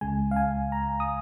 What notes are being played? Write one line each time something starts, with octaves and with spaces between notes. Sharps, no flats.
C#2 C#3 G#3 G#5
F5
G#5
A#5
D#6